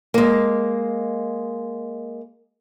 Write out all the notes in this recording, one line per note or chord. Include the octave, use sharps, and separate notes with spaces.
G#3 A#3